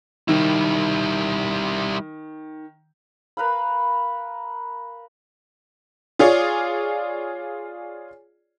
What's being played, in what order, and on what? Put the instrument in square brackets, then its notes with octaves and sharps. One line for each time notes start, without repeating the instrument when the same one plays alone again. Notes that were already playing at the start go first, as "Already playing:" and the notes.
[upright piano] D#3 [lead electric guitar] G3 E4
[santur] A#4 B4 F5 B5
[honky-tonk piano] F4 G#4 C#5 D5